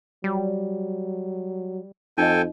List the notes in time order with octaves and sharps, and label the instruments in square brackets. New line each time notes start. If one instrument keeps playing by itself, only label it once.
[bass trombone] F#3 [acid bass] G3
[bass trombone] F2 [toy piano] D#4 D#5 [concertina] A4 G5 G#5